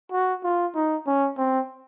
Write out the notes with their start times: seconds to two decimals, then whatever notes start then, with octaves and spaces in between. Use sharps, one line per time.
0.12 F#4
0.44 F4
0.75 D#4
1.07 C#4
1.38 C4